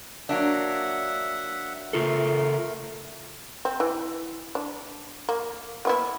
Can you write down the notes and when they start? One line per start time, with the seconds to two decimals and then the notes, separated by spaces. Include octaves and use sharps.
0.29 F#3 A#3 D4 E5 F#5
1.93 C#3 A3 F4 A4 A#4
3.65 C4
3.80 E3
4.55 D4
5.29 A#3
5.85 A#3 B3 E4